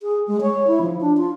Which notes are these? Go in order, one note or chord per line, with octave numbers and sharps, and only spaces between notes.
G#4
G#3
C#5
E4
F3
D4
F4